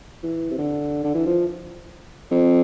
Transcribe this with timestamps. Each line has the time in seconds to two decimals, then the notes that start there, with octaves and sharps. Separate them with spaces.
0.23 E3
0.51 C3
0.58 D3
1.04 D3
1.14 E3
1.26 F3
2.31 F2